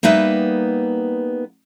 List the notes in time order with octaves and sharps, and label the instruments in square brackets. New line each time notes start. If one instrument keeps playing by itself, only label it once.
[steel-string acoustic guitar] G3 A#3 B3 D#4 B4 E5